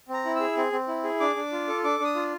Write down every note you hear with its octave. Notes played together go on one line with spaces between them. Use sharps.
C4 A#5
E4
G#4 E6
C4
C4
E4
G#4
D4 D6
D4
F4
A4
D4 D6
D4 D#6
F4